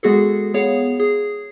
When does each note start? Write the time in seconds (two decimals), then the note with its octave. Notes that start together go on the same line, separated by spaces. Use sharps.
0.03 G#3 B3 F#4 G#4 A4
0.54 B3 G#4 C#5 F5
1.00 G#4